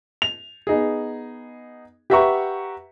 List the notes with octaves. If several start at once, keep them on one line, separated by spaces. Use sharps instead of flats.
F7
B3 D#4 G#4
G4 B4 E5 F#5 A#5 C#6